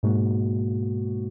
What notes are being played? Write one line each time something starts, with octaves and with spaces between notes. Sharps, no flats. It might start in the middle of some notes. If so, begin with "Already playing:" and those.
G#2 B2 G#3 A#3 F#4